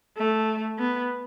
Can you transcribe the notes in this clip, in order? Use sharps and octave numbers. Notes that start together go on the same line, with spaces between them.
A3
B3